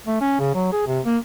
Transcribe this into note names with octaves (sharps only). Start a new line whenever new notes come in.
A3
C#4
C#3
F#3
G#4
C3
A#3